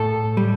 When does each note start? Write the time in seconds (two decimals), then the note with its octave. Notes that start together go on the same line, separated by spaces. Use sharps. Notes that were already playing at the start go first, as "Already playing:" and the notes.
Already playing: A2 A4
0.37 G3